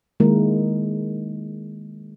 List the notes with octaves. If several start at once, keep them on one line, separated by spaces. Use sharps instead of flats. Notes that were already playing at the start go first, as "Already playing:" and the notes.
D#3 G#3 A#3 E4 A#4